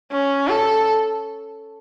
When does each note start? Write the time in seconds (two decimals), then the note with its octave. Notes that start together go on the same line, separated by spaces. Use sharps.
0.12 C#4
0.49 A4